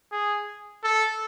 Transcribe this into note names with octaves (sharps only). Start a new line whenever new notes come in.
G#4
A4